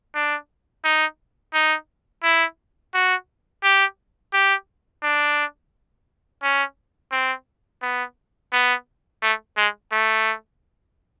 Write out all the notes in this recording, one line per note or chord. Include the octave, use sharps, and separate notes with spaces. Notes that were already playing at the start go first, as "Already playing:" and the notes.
D4
D#4
D#4
E4
F#4
G4
G4
D4
C#4
C4
B3
B3
A3
G#3
A3